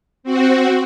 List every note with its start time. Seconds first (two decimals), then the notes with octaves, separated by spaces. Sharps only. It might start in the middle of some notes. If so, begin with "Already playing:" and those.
0.23 C4 F#4